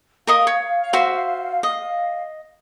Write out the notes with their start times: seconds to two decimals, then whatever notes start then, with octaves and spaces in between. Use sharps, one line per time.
0.27 A#4 D#5 F5 D#6
0.47 C#5
0.93 F#4 C5 E5
1.63 D#5